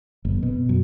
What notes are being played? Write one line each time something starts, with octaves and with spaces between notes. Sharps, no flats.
F#1
B2
F#2